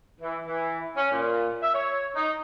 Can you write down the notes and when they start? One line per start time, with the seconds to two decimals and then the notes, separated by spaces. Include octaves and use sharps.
0.21 E3
0.46 E3
0.97 C#4
1.11 A#2
1.63 E5
1.74 C#5
2.15 D#4